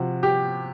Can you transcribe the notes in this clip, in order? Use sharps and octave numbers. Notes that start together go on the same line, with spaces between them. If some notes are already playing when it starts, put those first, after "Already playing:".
Already playing: C3 F3 F#4
G4